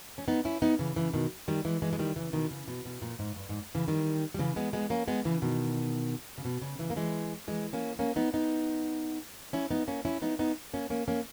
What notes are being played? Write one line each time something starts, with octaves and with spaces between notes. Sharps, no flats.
C#4
B3 D#4
C#4 E4
B3 D#4
C#3 E3
C#3 E3
B2 D#3
D#3 G3
E3 G#3
E3 G#3
G#3
D#3 G3
C#3 E3
B2 D#3
C#3
B2
B2
A#2
G#2
G2
G#2
C#3 E3
D#3 G3
G3
C#3 E3
G#3 B3
G#3 B3
A#3 C#4
G#3 B3
C#3 E3
B2 D#3
C#3
B2
C#3
C#3 E3
A#3
E3 G#3
E3 G#3
A#3 C#4
A#3 C#4
B3 D#4
B3 D#4
C#4 E4
B3 D#4
A#3 C#4
C#4 E4
B3 D#4
B3 D#4
A#3 C#4
A#3 C#4
A#3 C#4